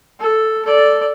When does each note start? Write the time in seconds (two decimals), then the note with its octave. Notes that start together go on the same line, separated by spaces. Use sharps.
0.19 A4
0.65 A4 D5